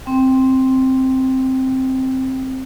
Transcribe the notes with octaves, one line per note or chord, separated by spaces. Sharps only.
C4 G5